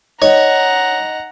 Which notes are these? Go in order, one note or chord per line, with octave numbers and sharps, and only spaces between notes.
D#4 C#5 F#5 A#5